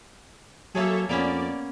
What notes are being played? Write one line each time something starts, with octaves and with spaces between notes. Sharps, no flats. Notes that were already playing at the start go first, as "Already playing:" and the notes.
F#3 A#3 G#4 A4 C#5 E5
F2 A#3 B3 C#4 D5